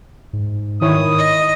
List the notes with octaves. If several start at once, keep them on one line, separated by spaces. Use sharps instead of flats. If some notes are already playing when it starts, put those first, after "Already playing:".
G#2
D#3 E4 C#5 D#6
D#5